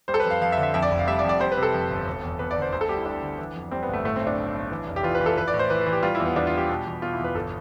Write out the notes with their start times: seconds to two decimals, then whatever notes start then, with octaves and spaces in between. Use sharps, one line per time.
0.08 G3 C5
0.14 A4
0.20 B4
0.25 F2
0.30 F5
0.41 F2 F5
0.52 E5
0.58 D3
0.63 E5
0.74 F2 E5
0.82 D5
0.91 F1
0.99 F5
1.08 G3 E5
1.19 D5
1.24 F2
1.29 D5
1.40 G3 C5
1.52 B4
1.57 C3
1.63 A4
1.74 F2
1.90 G1
2.07 E1
2.23 E2
2.39 E2 B4
2.51 D5
2.57 D3
2.62 C5
2.72 D2 C5
2.81 A4
2.89 G3 G4
2.98 E4
3.05 G3 D4
3.22 D3
3.38 E3
3.55 F2
3.71 G3 C4
3.83 B3
3.89 G1 A3
4.05 A2 A3
4.16 C4
4.21 B1
4.27 D4
4.38 B1
4.54 B1
4.71 E3
4.87 F1
4.96 G4
5.03 E3 F4
5.15 B4
5.21 E3
5.26 A4
5.37 E3 B4
5.48 D5
5.54 A2
5.59 C5
5.70 E3 B4
5.81 B4
5.86 E3
5.93 G4
6.03 G3 F4
6.15 E4
6.20 E2
6.25 B3
6.36 E2 D4
6.47 F4
6.53 G3 G4
6.69 B2
6.86 E2
7.02 B2 F4
7.13 E4
7.19 E2 B4
7.35 G1 A4